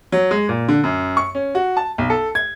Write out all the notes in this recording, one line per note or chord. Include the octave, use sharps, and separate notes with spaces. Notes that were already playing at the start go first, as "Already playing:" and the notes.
F#3
G#3
A#2
D3
F#2
C#6
C#4
F#4
A5
B1
A4
G#6